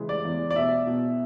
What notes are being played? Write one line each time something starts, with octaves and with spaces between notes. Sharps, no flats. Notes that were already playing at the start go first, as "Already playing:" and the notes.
Already playing: C#3 E3 G#3
D5
E2
D5
B2 E5
B2